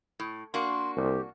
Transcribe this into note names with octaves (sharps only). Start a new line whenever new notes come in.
A2
A#3 D4 F#4 C6
C2 G4